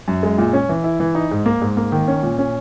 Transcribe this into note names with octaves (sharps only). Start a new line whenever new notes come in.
F#2
G#3
A#2
C#4
E3
E4
E3
D#4
G#2
A#3
G#2
A#3
D#3
C#4
A#2
C#4